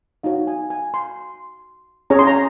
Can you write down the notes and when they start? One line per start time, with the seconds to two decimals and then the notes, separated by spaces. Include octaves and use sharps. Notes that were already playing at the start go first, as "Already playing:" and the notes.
0.23 D#4 F#4 C#5 F5
0.47 G#5
0.70 G#5
0.94 C6
2.10 C#4 G#4 C#5 A#5
2.19 C6
2.27 A#5